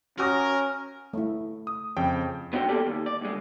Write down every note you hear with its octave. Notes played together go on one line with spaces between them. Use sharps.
C#4 F#4 A#4 D#6 A#6
A3 E4
D#6
F2 C#3 G5
B3 D4 F#4 C#5 F#5 G5
A#3 G4 A4 D5
D#2
D5
D2 G#3